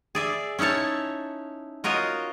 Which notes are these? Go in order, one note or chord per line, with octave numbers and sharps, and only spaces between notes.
G#4 D5 E5
C#4 D#4 E4 C#5 A5
F4 F#4 A#4 C#5 D#5